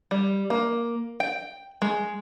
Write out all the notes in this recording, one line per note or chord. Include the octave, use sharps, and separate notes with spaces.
G3
A#3
G5
G#3